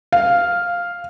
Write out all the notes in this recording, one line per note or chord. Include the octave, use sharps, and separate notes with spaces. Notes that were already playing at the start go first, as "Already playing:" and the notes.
F5